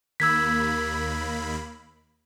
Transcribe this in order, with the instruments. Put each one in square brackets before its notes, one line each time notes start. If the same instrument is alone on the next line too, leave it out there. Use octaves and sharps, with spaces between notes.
[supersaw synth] D#2 A#3 B5 [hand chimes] E6 G#6 B6